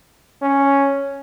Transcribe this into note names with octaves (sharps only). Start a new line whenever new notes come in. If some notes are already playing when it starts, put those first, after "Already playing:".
C#4